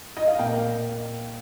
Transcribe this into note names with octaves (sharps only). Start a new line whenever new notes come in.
D#5
F5
A#2 A#3 G5